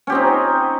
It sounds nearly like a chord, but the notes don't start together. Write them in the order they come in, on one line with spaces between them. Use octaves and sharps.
C#4 G4 C4 D#4